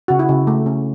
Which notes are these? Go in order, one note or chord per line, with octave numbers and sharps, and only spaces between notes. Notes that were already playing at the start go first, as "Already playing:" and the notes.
C#3 F#4
E4
C#3
A3
C#4